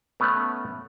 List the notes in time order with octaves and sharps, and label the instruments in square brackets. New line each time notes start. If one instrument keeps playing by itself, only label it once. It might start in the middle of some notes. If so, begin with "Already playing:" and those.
[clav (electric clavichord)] A3 B3 C#4